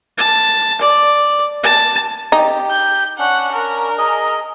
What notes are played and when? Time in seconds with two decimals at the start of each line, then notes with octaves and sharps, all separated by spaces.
0.18 A5
0.81 D5
1.63 A5
2.32 D#4 G4
2.71 G6
3.19 C#4 D4 F#5
3.53 A#4
3.98 G#4 D#5